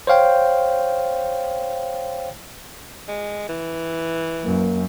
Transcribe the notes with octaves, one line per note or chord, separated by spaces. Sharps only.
C5 C#5 F5 G5
G#3
E3
F#2 A#3